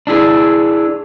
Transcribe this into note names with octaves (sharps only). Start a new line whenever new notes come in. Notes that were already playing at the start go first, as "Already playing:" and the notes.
D4 E4 G#4